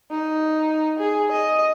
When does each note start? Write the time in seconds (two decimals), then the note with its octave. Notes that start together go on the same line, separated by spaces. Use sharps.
0.11 D#4
0.99 G#4
1.32 D#5